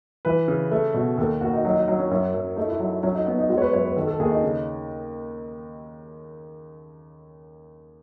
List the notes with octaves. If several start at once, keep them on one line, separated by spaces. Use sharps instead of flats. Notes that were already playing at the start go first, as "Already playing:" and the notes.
E3 B4
C#3
A3
B2
D#2 A4
D#2 F#4
D#4
F#3 D#4
D#4
F#3 D#4
C#4
F#2 C#4
F#2
A3 D#4
E4
F#3 D#4
F#3 C#4
D#4
B3 C#4
D#4
G#3 F#4
C#5
B4
F#2 C#5
B4
D#3 A4
A4
D#2 G#4
D#4
C#3